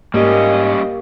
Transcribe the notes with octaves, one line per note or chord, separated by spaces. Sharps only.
G#2 G3 A#3 C#4 G4 D#5